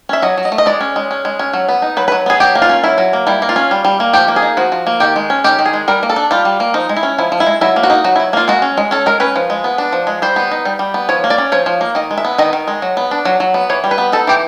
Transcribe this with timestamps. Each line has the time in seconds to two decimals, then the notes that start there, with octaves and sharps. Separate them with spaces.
0.09 C#4 E5
0.22 F#3 D#5
0.38 F#3
0.45 D#5
0.52 A3
0.58 D#5
0.66 G#3 D5
0.81 C#4
0.96 G#3
1.11 C#4
1.25 G#3
1.39 C#4
1.54 F#3
1.69 B3
1.82 D#4
1.97 F#3 B4
2.08 B4
2.12 F#3
2.26 B3 G#4
2.40 F#3 G4
2.55 A#3
2.62 F4
2.69 C#4
2.84 F#3 E4
2.98 F#3
3.13 A#3
3.27 G3 E4
3.42 A#3
3.49 F4
3.56 C#4
3.71 G3
3.85 G3
4.00 A#3
4.13 F3 G4
4.28 A#3
4.36 G#4
4.42 D#4
4.57 F3 F#4
4.72 F3
4.87 A#3
5.00 D#3 G4
5.16 G#3
5.30 C#4
5.44 D#3 G4
5.59 D#3
5.66 G#4
5.73 G#3
5.88 G3 A#4
6.03 A#3
6.09 A4
6.16 D4
6.31 G3 F4
6.45 G3
6.60 A#3
6.74 F3 D#4
6.89 G#3
6.96 E4
7.03 C#4
7.18 F3 E4
7.32 F3
7.40 E4
7.46 G#3
7.61 F#3 E4
7.76 A#3
7.83 F#4
7.90 D#4
8.04 F#3 F#4
8.16 E4
8.20 F#3
8.33 A#3 F4
8.48 G#3 F#4
8.62 C#4
8.78 G#3
8.91 C#4 A4
9.06 G#3 A#4
9.20 C#4 B4
9.36 F3
9.50 G#3
9.64 B3
9.78 D4
9.92 F3
10.07 G#3
10.22 G3 C5
10.36 B3
10.51 D#4
10.65 G3
10.79 G3
10.94 B3
11.09 F3 C#5
11.24 A#3
11.30 D5
11.38 C#4
11.52 F3 C#5
11.66 F3
11.81 A#3
11.95 D#3 D#5
12.11 G#3
12.18 E5
12.25 B3
12.38 D#3 D#5
12.53 D#3
12.68 G#3
12.82 F#3
12.97 B3
13.11 D4
13.25 F#3
13.40 F#3
13.54 B3
13.70 E3 C#5
13.84 G3
13.91 B4
13.98 B3
14.12 D#4 A4
14.27 E3 G4